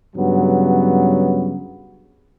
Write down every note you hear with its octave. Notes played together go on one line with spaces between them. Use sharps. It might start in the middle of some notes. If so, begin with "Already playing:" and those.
G2 C#3 F#3 B3